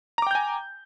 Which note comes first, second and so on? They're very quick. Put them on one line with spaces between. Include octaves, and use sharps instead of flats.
A#5 D6 G5 G6 G#5